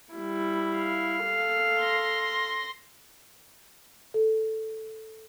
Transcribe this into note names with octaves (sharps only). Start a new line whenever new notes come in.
G3 E4
F5
A4
C6 A#6
A4